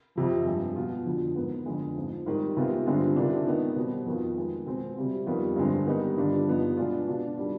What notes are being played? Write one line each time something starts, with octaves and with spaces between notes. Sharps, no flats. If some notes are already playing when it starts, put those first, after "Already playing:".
F2 C3 F3
G2 F3 G#3
B2 B3 F4
F2 D3 F3
G#2 D#3 B3
F2 D3 G#3
G#2 F3 C4
G#2 D#3 G3
C3 D#3 G#3 B3 F4
G2 D3 G#3 C4 F4
C3 D#3 G#3 D4 F4
D#3 B3 D#4
B2 G3 C4
F2 D#3 B3 F4
D#3 G#3 B3
B2 G#3 C4
C3 G3 C4 F4
F2 D#3 G3 B3 F4
G2 D3 G#3 C4
D#3 G3 B3 D#4
G2 D3 G3 D4 F4
G2 F3 B3 D#4
B2 G#3 D4 F4
B2 B3 D4 F4
D#3 G3 D4